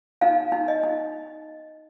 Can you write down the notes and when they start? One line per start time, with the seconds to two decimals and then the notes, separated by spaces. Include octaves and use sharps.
0.21 D#4 F5
0.52 D#4
0.68 D#5
0.83 D#4